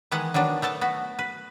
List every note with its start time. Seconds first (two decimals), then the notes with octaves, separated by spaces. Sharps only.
0.12 D#3 E3 G#3 B3 F#5
0.34 D#3 F#3 B3 D4
0.62 A3 B3 A4 A5
0.81 B3 F#4
1.19 B4